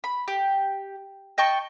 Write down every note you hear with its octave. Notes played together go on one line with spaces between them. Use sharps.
B5
G4
D#5 G5 A5 C#6